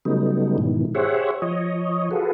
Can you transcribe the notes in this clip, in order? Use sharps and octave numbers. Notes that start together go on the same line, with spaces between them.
C#3 F#3 G3 A3 B3 D#4
G#2 B2 D#3 E3
G4 G#4 C5 C#5 E5 F#5
F3 C#5 D#5
F4 F#4 G#4 A4 B4